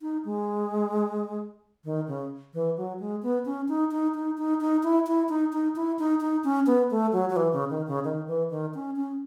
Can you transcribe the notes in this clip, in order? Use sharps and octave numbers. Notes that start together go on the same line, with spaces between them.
D#4
G#3
D#3
C#3
E3
F#3
G#3
B3
C#4
D#4
D#4
D#4
D#4
D#4
E4
E4
D#4
D#4
E4
D#4
D#4
C#4
B3
A3
F#3
F#3
E3
C#3
D#3
C#3
D#3
E3
D#3
C#4
C#4